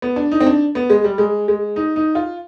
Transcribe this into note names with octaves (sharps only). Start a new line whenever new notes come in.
B3
D4
D#4
C4
D4
B3
G#3
G3
G#3
G#3
D#4
D#4
F4